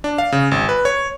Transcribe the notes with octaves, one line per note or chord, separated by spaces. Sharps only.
D4
F5
C#3
G#1
B4
C#5